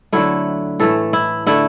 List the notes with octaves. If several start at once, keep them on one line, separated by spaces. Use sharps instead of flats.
D3 F#3 A3 E4
A2 E3 A3 A4
E4
D3 A3 E4